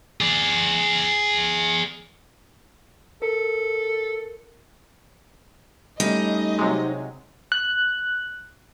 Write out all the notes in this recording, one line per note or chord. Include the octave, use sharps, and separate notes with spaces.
G#4 D5
A4 A#4
G3 A3 C#4 D#4 D#5
C3 F#3 G#3
F#6